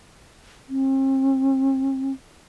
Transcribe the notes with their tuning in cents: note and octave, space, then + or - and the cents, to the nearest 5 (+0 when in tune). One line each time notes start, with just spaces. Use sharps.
C4 +40